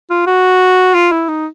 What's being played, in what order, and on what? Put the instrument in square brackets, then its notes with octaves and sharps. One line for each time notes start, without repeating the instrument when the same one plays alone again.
[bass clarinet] F4
F#4
F4
E4
D#4